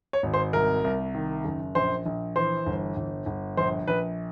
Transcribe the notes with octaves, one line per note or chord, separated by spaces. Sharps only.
C#5
G#1
C5
C2 A#4
C2
D#3
F#1
A#1 C5
A#1
E3 C5
G1
G1
G1
A#1 C5
A#1 B4